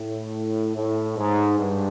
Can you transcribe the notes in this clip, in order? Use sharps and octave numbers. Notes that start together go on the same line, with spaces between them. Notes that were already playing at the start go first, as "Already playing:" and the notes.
Already playing: A2
A2
G#2
G2